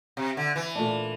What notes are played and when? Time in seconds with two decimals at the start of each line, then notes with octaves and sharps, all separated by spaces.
0.17 C3
0.37 D3
0.56 E3
0.75 A#2 A3 D4